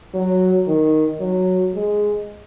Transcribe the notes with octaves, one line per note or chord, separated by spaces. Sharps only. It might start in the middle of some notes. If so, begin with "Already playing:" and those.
F#3
D#3
F#3
G#3